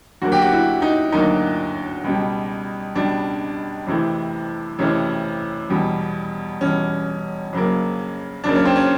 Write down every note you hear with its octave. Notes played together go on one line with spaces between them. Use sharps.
D2 D3 F#3 A#3 F#4
G4
F#4
E4
D#4
D2 D3 F#3 A#3 D#4
C#2 B2 G3
C#2 B2 G3 D4
F2 C3 E3 A3
F2 C3 E3 A3 C#4
E2 B2 G3
E2 B2 G3 C#4
F2 C#3 F#3 A#3
F2 C#3 F#3 A#3 D4
C#4
C4
C#4